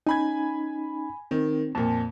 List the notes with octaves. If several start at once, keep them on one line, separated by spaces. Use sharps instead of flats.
C#4 D#4 G#5 B5 G#6
D#3 C4
F2 A#2 A5